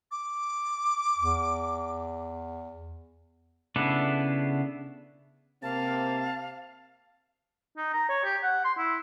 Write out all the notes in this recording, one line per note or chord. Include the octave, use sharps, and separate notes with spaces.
D6
E2
C#3 B3 D4 E4 A4
C3 A#3 C4 F5 A5
D#4
A#5
C#5
G4
F#5
C6
E4